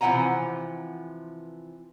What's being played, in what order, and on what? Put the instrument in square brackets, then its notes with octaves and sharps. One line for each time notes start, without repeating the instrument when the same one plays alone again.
[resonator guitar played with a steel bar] C3 E3 F3 F#5 G#5 A#5